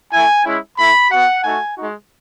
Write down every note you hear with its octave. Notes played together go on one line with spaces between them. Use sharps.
A3 E4 G#5
G#3 C#4 E4
A3 E4 B5
B3 F#4 F#5
A3 D#4 F#4 G#5
G#3 D#4 F#4